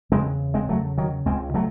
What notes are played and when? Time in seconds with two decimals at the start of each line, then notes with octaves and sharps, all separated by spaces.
0.12 E2 C#3 G#3 C4
0.54 G#3 C4
0.69 F#3 A3
0.98 D#3 F#3
1.26 C#2 C#3 G#3 C4
1.54 F#3 A3